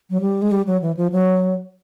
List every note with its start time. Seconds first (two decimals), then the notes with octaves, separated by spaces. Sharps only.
0.10 F#3
0.21 G3
0.42 G#3
0.52 G3
0.67 F#3
0.82 E3
0.97 F3
1.12 F#3